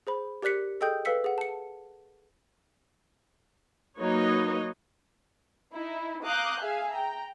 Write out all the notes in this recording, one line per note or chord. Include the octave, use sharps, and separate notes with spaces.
G#4 C5 B5
G4 A#4 D5 F#6 B6 C#7
G#4 A4 D#5 G5 D#6 G6
A4 B4 F5 E6 B6 C#7
G#4 F#5
A5 C#7
F#3 A#3 D#4 B4 C#5 D#5
D#4 E4
F5 A#5 D6 D#6 F#6 G6
G#4 E5 F5 G#5
G5 A#5